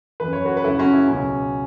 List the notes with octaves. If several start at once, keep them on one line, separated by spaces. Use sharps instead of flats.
F#2 E3 B4
C#5
F#4 B4
B4
F#2 C#3 F#3 E4 A4
C#4 F#4
E4
C#2 B2 F#3 C#4